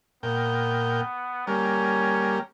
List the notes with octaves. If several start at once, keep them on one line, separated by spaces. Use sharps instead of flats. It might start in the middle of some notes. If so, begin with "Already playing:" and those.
A#2 B3 G5
G3 A#3 C#4